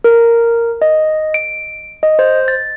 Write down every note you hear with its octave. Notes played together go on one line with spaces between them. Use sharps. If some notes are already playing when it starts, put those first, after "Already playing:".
A#4
D#5
D7
D#5
C5
A6